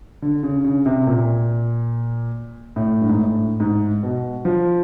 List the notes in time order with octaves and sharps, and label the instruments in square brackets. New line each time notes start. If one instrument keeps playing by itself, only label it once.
[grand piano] D3
C#3
C#3
C3
A#2
A2
G2
G#2
A2
G#2
B2
F3